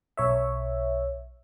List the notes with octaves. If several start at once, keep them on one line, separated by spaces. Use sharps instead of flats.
B1 C#5 E5